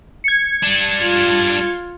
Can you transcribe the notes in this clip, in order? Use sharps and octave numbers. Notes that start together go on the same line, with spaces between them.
G#6 C#7
G3 D4
F4